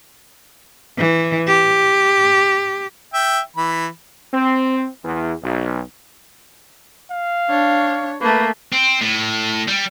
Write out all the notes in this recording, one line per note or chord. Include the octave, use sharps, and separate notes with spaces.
E3
G4
E5 G5
E3 B5
C4
E2
B1
F5
D4 C#5
A3 A#3 B4
C4
A2
G3